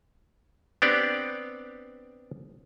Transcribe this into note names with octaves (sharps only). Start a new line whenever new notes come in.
B3 C4 D4 G4 D5